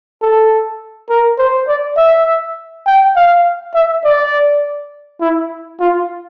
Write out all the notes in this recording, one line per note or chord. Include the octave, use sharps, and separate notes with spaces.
A4
A#4
C5
D5
E5
G5
F5
E5
D5
E4
F4